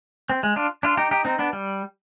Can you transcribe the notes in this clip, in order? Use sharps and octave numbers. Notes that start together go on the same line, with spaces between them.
C4
G#3
D4 F4
D4 F4
D#4 G4
D#4 G4
C4 D#4
B3 D4
G3